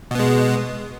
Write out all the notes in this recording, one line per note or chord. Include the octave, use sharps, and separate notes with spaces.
B2 G#3 B3